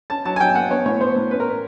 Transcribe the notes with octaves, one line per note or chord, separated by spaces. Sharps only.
C#4 A5
F#3 A5
G#5
F#3 G5
A#3 F#5
B3 C#5
A2 C#5
B3 C5
A2
C#4 B4
A#4
B4